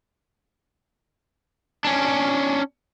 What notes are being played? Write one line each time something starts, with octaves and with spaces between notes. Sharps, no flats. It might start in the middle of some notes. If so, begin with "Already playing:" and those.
C#4 D4